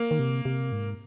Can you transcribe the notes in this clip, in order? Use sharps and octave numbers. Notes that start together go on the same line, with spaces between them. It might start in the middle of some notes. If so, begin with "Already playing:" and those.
Already playing: A#3
D#3
C3
C3
G#2